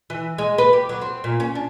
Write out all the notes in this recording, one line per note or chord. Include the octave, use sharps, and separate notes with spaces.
E3
G#3
B4
G4
F#3
C4
A#2
C#4
D4